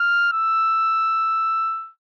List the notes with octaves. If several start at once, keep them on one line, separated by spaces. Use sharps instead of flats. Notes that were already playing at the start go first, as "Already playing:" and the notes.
Already playing: F6
E6